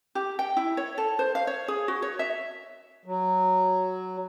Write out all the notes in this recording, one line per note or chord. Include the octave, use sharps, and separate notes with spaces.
G4
G5
E4
C#5
A4
C5
F5
C#5
G#4
F#4
C#5
E5
F#3